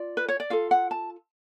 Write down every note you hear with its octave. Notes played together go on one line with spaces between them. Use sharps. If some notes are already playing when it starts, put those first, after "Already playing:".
Already playing: F4 D5
B4
C#5
D5
F4 A4 F5
F#5
A5